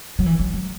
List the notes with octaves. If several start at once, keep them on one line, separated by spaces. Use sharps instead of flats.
F#3
E3
F#3
F#3